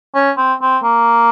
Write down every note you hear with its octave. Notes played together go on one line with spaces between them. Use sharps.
C#4
C4
C4
A#3